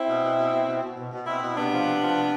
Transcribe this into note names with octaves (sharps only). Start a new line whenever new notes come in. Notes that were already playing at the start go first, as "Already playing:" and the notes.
Already playing: C4 E4
B2
B2
B2
B2
B2
B2
B2
B2
B2 C4 E4
B2
C3 B3 D4
F3
C3
F3
C3